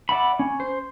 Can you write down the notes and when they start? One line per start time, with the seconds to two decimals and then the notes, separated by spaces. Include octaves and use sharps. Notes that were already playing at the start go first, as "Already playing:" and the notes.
0.09 D5 E5 F#5 B5
0.39 C#4
0.60 C5